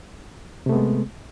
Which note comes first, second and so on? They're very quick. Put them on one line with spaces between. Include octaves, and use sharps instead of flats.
C3 A3 B3 G#3